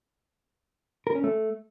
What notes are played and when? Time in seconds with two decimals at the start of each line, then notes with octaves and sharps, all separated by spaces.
1.07 A#4
1.15 C#4
1.24 A3